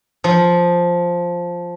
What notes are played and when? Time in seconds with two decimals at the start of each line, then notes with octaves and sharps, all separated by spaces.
0.24 F3